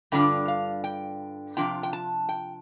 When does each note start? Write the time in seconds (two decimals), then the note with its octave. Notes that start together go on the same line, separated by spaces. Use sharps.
0.12 G2 D3 G3 D4 F4 G5
0.48 F5
0.84 G5
1.57 C3 F3 D4 F4 G5
1.83 G5
1.93 A5
2.29 G5